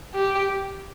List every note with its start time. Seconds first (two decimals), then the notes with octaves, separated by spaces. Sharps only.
0.15 G4